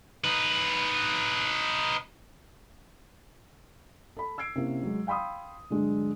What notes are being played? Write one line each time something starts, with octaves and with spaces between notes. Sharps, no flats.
D#4 B4
A4 B5
E6 G#6 C7 D7
C3 A#3 C#4 E4
F#3 G#3
F5 G5 B5 C6 D#6
G2 D3 F#3 G#3